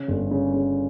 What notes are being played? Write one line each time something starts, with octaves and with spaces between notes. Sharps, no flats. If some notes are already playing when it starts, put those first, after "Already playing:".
Already playing: C#3
G1
C#3
C#3